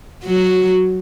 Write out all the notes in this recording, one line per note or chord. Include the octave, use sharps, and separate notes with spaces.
F#3 F#4